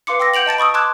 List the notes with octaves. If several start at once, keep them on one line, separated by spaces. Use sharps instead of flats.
B4 F5 C6 D6 C#7
G5 D6 E6 A#6
F#5 G6 D7 F7 F#7
D#5 A5 A6 D7
B5 C#6 D#6 E6
A5 C6 D6 E6 F#6 G#6